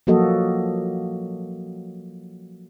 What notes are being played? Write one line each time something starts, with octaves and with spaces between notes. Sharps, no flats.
F3 F#3 A#3 F#4 A4 D#5